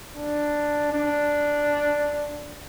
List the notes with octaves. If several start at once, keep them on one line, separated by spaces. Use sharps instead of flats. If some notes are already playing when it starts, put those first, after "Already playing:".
D4
D4